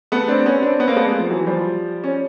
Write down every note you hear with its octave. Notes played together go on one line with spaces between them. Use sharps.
A3 B3
C4 D4
B3 C#4
C4 D4
B3 C#4
A#3 C4
A3 B3
G#3 A#3
F3
E3 F#3
F3 G3
C#4